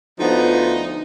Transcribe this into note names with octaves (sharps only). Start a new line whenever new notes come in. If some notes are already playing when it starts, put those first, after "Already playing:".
D2 F3 B3 D#4